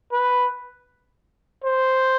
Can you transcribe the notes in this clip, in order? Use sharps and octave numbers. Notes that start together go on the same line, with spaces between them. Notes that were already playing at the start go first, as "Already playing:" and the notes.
B4
C5